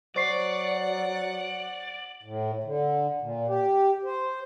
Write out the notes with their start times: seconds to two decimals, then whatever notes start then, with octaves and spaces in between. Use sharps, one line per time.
0.16 F#3 C5 D5 F#5 C#6 C7
2.23 A2
2.64 D3
3.21 A#2
3.48 G4
4.05 C5